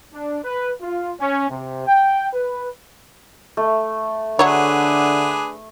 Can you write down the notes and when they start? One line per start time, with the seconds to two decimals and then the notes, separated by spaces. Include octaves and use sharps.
0.13 D4
0.43 B4
0.80 F4
1.20 C#4
1.50 C3
1.87 G5
2.33 B4
3.57 A3
4.39 D3 F#3 D4 G#4 B4 C#5